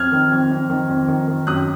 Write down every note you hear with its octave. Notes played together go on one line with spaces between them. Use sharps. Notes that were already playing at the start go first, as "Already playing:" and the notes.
Already playing: F2 F6 G#6
D#3
F2
F2
D#3
F2
D#3
D#3
F#2 D#6 F#6